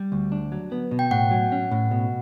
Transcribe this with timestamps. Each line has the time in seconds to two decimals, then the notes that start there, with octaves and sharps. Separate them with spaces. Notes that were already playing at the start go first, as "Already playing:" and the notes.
Already playing: G3
0.12 D2
0.32 D4
0.52 F#3
0.72 B3
0.91 B2
0.99 G5
1.11 A2 F#5
1.31 F#3
1.52 C#4
1.71 A2
1.91 B2